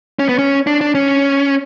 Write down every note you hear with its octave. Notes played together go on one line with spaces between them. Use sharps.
C#4
B3
C#4
D4
D4
C#4